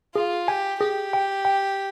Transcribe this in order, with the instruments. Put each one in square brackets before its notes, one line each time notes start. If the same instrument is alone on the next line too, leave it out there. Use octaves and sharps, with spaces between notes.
[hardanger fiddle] F4 [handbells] G#4
[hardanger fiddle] G4 [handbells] G#5
[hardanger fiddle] G4 [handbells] G#4
[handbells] G5
G5